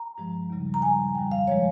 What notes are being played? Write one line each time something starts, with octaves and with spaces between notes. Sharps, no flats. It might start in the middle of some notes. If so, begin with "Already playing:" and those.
Already playing: A#5
G2 F3 G#3
D#2 C#3 G3
A#5
A#2 G3 G#5
F2 D#3 G3 G5
F5
F3 G#3 C#5